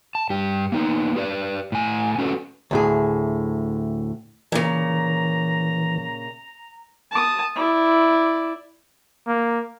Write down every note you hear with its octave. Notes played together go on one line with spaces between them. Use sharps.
A5
G2 G4
A#3 B3 D#4
G4 B4 D5
A2 G#5
C#4 F#4 A4 B4
D2 A2 G#4
A#2 C#3 E3 A#5
A5 D#6
E4 D5
A#3